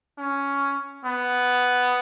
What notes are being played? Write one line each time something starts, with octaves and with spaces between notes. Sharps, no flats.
C#4
B3